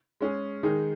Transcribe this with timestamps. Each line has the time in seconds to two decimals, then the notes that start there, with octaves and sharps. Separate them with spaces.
0.21 G#3 C#4 G#4
0.63 D#3 G#3 D#4 G#4